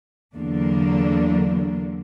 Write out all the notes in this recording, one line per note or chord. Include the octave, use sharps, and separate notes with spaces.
E2 D3 F#3 A#3 D4